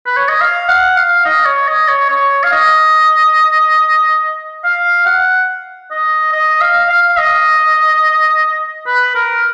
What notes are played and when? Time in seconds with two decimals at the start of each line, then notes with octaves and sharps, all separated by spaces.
0.06 B4
0.16 C#5
0.29 D#5
0.41 F5
0.68 F#5
0.97 F5
1.25 D#5
1.45 C#5
1.68 D#5
1.88 C#5
2.10 C#5
2.43 F5
2.52 D#5
4.64 F5
5.06 F#5
5.91 D#5
6.32 D#5
6.61 F5
6.90 F5
7.18 D#5
8.87 B4
9.15 A#4